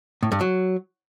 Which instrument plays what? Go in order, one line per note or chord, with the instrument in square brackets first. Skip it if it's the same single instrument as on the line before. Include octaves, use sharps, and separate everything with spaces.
[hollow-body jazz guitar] A2
G2
F#3